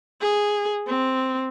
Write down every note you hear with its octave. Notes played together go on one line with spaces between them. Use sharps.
G#4
C4